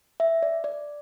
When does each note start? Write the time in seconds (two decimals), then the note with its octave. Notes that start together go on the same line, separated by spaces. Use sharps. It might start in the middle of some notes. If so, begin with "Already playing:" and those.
0.20 E5
0.42 D5
0.64 D5